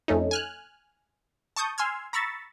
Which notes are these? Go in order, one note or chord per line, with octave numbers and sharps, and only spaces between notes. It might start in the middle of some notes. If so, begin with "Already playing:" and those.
F2 A3 C#4 D#4
G#5 F6 F#6
A5 C#6 D#6 G6
G#5 C6 E6 F6 G#6
A#5 B5 C#6 E6 A6